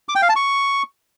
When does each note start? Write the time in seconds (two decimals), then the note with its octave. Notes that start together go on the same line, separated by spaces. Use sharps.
0.09 D6
0.15 G5
0.22 F5
0.29 A5
0.36 C#6